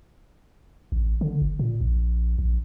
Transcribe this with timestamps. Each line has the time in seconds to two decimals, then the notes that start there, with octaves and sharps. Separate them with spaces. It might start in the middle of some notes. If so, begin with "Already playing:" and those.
0.92 A1
1.21 D3
1.41 G1
1.59 A#2
1.81 A#1
2.39 A#1